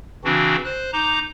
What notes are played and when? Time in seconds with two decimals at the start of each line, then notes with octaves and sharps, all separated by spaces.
0.24 C#3 E3 C4 D4 F#4
0.65 C5 F#6
0.93 D#4 A#5 D6 G6